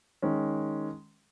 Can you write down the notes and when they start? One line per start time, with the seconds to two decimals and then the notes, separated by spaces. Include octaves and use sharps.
0.22 D#3 G#3 C#4